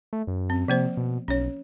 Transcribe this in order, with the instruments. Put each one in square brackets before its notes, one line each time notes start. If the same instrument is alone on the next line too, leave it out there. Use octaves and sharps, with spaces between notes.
[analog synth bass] A3
F#2
[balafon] C4
[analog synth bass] C3 [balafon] F3 A#3 C5
[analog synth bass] B2
[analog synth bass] B1 [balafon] C#4 C#5